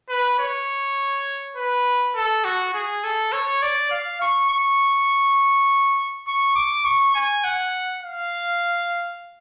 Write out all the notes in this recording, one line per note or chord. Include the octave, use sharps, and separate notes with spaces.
B4
C#5
B4
A4
F#4
G#4
A4
C#5
D5
F5
C#6
C#6
C#6
D6
C#6
G#5
F#5
F5